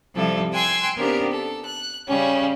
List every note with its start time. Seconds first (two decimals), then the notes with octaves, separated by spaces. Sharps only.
0.15 C3 F3 G3 C4 E4 A4
0.52 G5 G#5 C6 E6 F#6 G#6
0.97 C#3 B3 C4 D4 G4 A#4
1.31 A4
1.65 F#6
2.08 C#3 G3 C#4